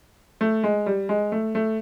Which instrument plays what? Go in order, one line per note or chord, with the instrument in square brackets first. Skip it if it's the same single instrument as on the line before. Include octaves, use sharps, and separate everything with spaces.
[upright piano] A3
G#3
G3
G#3
A3
A3